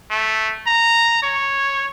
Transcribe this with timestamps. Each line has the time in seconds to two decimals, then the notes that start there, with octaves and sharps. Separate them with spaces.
0.10 A3
0.67 A#5
1.23 C#5